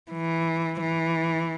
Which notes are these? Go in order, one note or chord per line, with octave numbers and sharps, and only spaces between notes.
E3
E3